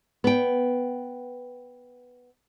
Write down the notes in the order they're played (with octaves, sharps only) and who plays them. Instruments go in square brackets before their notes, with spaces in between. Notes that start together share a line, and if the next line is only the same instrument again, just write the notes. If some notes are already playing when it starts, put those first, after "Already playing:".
[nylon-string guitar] B3 G5